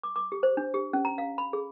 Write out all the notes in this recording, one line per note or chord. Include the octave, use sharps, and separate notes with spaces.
D6
D6
G4
C5
D4
G4
C#4
A#5
F5
B5
G#4